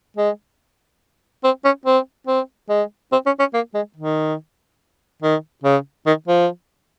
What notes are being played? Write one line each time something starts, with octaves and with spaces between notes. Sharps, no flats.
G#3
C4
C#4
C4
C4
G#3
C4
C#4
C#4
A#3
G#3
D#3
D#3
C#3
D#3
F3